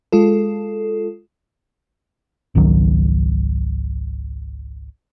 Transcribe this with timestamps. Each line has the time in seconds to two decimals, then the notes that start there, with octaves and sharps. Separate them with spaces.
0.12 G#3 F4 A4
2.55 G#1 C#2 D#3 F#3